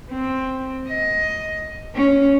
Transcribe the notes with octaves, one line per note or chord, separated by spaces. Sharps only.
C4
D#5
C#4